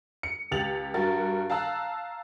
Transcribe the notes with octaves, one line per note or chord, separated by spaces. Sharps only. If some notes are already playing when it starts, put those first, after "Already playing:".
C#7
C#2 G4 A6 F7 F#7
G2 F#4 A#4 A6
F5 A5 A#5 E6 F#6